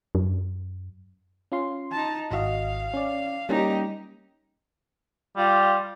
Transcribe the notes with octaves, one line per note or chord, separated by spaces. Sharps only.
F#2
C#4 F4 C6
D#4 A5
G#1 F#4 D#5 F5
C#4 D5
G3 A#3 C#4 D#4 G4
G3 F4